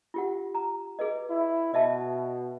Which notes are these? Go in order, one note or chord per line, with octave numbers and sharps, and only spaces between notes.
F4 G4 F#5
A#5
G#4 B4 D#5
E4
B2 D#5 E5 A5